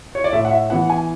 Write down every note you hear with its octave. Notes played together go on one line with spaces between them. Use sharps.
C#5
D5
A2 E5
F#5
E5
E3 B3 E4 F#5
G#5